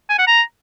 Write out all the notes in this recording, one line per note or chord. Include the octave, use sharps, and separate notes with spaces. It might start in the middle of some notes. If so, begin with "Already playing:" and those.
G#5
F#5
A#5